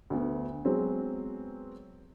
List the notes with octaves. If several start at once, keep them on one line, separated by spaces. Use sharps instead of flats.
D2 B3
F#3 G#3 B3 C4